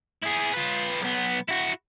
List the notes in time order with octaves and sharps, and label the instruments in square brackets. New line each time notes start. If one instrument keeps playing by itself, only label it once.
[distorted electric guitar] E4 G#4
F4 B4
B1 B3
E4 F#4